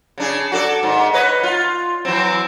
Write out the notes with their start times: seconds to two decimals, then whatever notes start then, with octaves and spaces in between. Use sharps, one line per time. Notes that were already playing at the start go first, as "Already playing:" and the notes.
0.18 C#3 D4 G#4
0.52 F#4 A4 D5
0.83 G#2 D#3
1.13 B4 C#5 D#5
1.43 F4
2.05 E3 F#3 C4